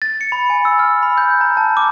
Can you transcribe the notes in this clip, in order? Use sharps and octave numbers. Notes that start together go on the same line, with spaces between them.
A6
C#7
B5
G#5
E6
F6
B5
G6
A#5
A5
D6